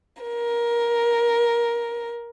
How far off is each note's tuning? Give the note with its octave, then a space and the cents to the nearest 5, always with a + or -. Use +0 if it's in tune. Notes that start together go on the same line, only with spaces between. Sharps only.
A#4 +15